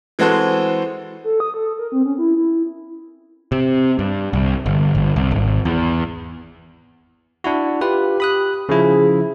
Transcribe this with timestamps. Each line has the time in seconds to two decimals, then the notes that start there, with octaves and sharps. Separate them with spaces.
0.19 E3 G#3 C4 F#4 A4 C5
1.24 A4
1.40 D#6
1.54 A4
1.78 A#4
1.92 C4
2.05 C#4
2.18 E4
2.36 E4
3.52 C3
3.99 G2
4.33 C2
4.66 G1
4.95 G1
5.16 C2
5.31 G#1
5.65 E2
7.44 D4 E4 F#4
7.81 F4 G4 B4
8.20 B5 D#6 F#6
8.69 C#3 F3 E4 G#4